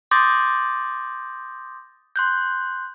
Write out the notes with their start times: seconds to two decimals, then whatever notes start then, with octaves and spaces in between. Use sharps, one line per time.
0.11 C6 D6 D#6 G6 A6 A#6
2.16 C6 F#6 G6